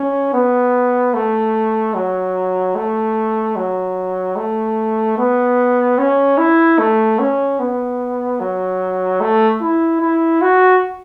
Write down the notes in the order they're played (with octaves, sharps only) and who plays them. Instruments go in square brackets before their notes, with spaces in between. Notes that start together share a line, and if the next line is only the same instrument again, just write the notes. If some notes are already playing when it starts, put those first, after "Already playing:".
Already playing: [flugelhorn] C#4
B3
A3
F#3
A3
F#3
A3
B3
C#4
E4
A3
C#4
B3
F#3
A3
E4
E4
F#4